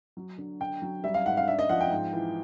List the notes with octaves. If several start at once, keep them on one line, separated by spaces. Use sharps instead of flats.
F#3
D3
D3 G5
F#3
G3 E5
F5
G#2 F#5
F5
D4 E5
D#5
F3 F#5
G5
G#2
E3